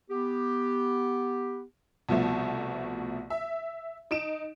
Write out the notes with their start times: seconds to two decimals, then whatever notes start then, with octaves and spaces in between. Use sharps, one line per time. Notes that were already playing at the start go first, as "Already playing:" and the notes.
0.11 B3 G4
2.09 C2 B2 F3 A3
3.30 E5
4.11 D#4 D7 E7